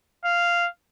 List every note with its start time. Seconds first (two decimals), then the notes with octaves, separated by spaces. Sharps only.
0.25 F5